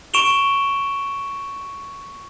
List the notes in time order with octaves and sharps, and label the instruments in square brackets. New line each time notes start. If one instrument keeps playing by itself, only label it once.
[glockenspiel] C#6 D7 E7 F7 G7